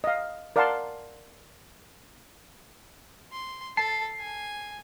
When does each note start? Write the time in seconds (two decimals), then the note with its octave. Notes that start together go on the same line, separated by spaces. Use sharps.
0.04 D#5 F5
0.56 A#4 D5 F5 F#5 A5 C6
3.33 C6
3.77 A4 A5 C7
4.20 G#5